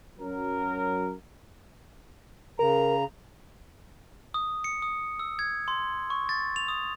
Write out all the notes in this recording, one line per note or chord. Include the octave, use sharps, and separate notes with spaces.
F#2 F#3 A#4
C#3 A#4 A#5
D#6
C#7
D#6
E6
G#6
C6
C#6
A6
F7
D#6